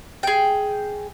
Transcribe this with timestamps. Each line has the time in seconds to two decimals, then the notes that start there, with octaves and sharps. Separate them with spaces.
0.23 G#4 G5